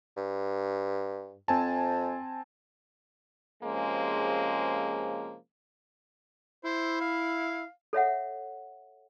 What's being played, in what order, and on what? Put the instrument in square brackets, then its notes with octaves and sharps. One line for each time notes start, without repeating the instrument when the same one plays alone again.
[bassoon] G2
[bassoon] F2 [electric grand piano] C4 G#5 A5
[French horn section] C3 F3 G#3 A#3 C#4 G#4
[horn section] E4 [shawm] C5
[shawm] F5
[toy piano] A4 C#5 E5 F#5